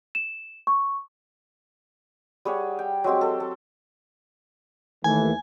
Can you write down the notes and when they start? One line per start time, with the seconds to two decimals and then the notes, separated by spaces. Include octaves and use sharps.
0.15 E7
0.67 C#6
2.45 G3 G#4 C#5 F#5
2.79 G5
3.04 F#3 G#3 C4 G4
3.21 A4
3.40 A4
5.04 D#2 E3 A3 G#5